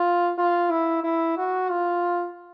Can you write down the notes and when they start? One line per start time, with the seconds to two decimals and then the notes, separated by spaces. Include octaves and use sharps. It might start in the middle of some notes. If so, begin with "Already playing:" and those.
Already playing: F4
0.38 F4
0.71 E4
1.03 E4
1.38 F#4
1.70 F4